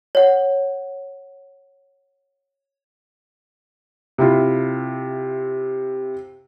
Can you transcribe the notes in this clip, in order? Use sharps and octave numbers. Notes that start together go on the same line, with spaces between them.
C#5 F#5
C3 E4 F4